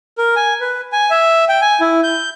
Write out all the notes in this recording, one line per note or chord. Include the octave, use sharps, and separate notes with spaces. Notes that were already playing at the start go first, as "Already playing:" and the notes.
A#4
G#5
B4
G#5
E5
G5
G#5
E4
G6